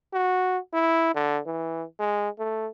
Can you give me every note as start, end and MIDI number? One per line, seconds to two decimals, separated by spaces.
0.14 0.58 66
0.74 1.15 64
1.15 1.39 50
1.47 1.84 52
1.99 2.29 56
2.39 2.68 57